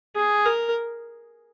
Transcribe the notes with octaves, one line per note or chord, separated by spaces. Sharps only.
G#4
A#4